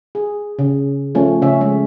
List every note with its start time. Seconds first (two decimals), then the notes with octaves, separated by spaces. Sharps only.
0.15 G#4
0.59 C#3
1.15 F3 A3 C#4
1.42 C#3 C#4 E5
1.61 G#3 C#4